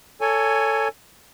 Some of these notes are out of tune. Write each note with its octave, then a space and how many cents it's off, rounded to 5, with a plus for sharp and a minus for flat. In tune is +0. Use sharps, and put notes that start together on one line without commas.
A4 +15 C#5 +15 G#5 +0